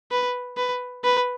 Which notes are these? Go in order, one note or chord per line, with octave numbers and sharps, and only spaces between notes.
B4
B4
B4